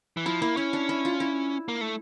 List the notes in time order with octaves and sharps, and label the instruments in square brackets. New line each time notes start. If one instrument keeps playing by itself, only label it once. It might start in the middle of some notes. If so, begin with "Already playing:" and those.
[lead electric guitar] E3
[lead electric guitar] F3 [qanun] E4
[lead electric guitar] A#3 [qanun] E4
[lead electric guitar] C#4 [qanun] E4
[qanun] D4
E4
F4
E4
[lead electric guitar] A#3
A3